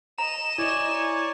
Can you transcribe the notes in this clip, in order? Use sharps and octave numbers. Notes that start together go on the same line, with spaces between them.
D#5 A#5 E7
E4 C#5 D5 G#5